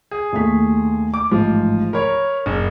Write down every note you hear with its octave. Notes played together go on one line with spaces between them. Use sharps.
G#4
D#2 A3 B6
D6
A1 G#2 F3
A#4 C#5 B5
F#1